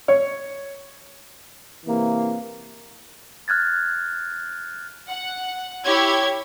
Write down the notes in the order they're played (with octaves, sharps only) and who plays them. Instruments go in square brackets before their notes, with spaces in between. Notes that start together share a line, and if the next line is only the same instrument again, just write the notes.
[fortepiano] C#5
[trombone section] C3 E3 A#3
[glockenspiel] F6 F#6 G#6 A6
[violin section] F#5
E4 G4 C#5 G#6